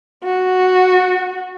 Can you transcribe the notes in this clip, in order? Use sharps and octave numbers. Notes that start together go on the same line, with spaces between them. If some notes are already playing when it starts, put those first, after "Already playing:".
F#4